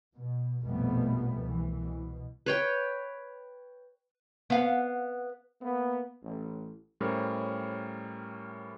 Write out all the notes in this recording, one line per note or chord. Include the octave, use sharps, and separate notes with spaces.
B2
A#1 F2 B2 G3 A3 B3
C2 E3
B2
B4 C#5 G5
B3 F5
A#3 B3
A1
A2 G3 C#4 A#4 C5 C#5